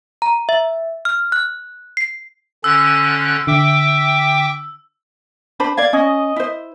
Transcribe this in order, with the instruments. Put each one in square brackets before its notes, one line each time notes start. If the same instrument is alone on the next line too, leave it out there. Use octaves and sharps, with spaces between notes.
[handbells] A#5
E5
F6
F#6
C7
[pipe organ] D3 C#4 F#6 [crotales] E6
[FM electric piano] D3 [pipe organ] E5 G5 D6
[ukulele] D4 C5 B5
[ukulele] D5 F5 [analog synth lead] G#6
[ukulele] C#4 [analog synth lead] D#5
[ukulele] E4 C5